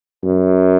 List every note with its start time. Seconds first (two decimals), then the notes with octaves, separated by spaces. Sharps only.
0.24 F#2